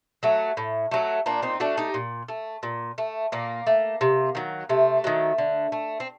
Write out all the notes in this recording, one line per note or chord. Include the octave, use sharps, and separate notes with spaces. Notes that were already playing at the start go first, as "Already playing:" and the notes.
F#3 A3
A2
F#3 A3
A#2 A#3 D4
C4 D#4
A3 D4 F#4
D#4 G4
A#2
A3
A#2
A3
A#2 A#3
A3
C3
D#3 F#3
C3 A3
D#3 F#3
D3
A3
C4